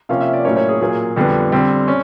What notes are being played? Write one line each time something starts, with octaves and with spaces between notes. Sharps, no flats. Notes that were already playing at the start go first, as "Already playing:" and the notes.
C3 F3 A#3 C#4 F5
E5
D5
A2 F#3 A#3 C#4 C#5
C#5
G#4
A#2 F#3 A#3 G#4
F2 D3 G3 B3
D3 G3 C4
C#4